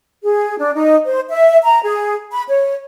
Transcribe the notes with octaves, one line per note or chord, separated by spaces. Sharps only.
G#4
D4
D#4
C5
E5
A#5
G#4
B5
C#5